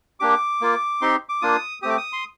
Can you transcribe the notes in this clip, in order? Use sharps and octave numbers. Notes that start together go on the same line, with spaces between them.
A#3 D4 G4 D6
A#3 F4
C4 D#4 G4 C6
D6
A#3 D4 F4 D#6
A3 C4 G4 D#6
D6
D#6
C6